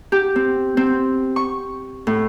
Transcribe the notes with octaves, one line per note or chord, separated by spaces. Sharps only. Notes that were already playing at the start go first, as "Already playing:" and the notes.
G4
C4
C4
C#6
A2